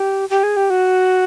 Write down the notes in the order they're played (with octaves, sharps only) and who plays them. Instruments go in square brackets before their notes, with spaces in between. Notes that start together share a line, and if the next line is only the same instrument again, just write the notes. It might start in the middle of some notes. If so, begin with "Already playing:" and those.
Already playing: [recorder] G4
G4
G#4
G4
F#4